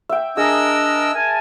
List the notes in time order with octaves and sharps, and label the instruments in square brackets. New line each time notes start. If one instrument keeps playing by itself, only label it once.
[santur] E5 G5
[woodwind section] D4 A#4 [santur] G#4 [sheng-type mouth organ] D#5 E6
[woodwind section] A#4 G#5 A5